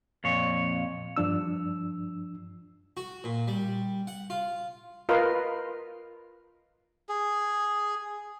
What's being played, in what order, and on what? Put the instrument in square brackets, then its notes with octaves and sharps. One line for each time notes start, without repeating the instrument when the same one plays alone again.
[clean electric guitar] F2 A#2 C#5
[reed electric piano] G2 F3 D4 E6
[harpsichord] F#4
A#2
G3
F#5
F4
[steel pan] F4 A#4 B4 D#5 F5
[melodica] G#4